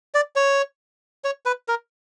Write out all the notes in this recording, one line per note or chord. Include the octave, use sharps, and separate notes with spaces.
D5
C#5
C#5
B4
A#4